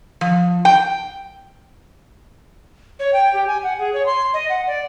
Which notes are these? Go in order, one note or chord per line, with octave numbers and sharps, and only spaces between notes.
F3
G5
C#5
G5
G4
G#5
F#5
G#4
C#5
C6
D#5
F#5
D5